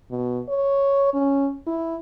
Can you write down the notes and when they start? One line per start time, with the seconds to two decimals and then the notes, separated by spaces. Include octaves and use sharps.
0.11 B2
0.49 C#5
1.14 C#4
1.67 E4